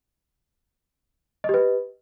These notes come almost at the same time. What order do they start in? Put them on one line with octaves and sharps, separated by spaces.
D#5 G4 B4